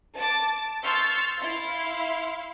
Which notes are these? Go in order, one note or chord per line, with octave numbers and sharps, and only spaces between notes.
A5 D6 A6
C6 C#6 E6 F6 G6 A6
E4 F5 C6